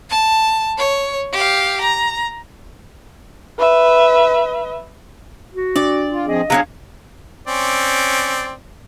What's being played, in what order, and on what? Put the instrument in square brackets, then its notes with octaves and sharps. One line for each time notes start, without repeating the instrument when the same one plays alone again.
[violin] A5
C#5
G4 F5
A#5
[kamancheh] B4 E5
[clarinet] F#4
[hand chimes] D4 [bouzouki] D5
[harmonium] F4
[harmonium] F3 C4 G#4 [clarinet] D#5
[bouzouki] F#3 B3 C#4 [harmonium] D4 G#4 F5
[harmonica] C4 C#4 D5